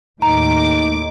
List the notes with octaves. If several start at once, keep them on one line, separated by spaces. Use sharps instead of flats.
D#2 A2 D#4 A#5 D6